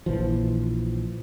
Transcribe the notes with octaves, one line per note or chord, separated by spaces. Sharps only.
A#1 E3 F3